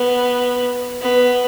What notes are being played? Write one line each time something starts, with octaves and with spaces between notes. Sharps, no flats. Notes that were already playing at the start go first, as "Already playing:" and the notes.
Already playing: B3
B3